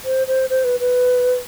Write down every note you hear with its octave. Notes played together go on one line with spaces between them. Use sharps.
C5
C5
C5
B4
B4